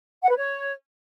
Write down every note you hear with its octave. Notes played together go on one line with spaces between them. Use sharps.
F#5
B4
C#5